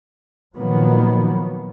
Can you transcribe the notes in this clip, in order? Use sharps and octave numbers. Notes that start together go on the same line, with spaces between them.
A#2 D#3 F3 F#3 A#3 B3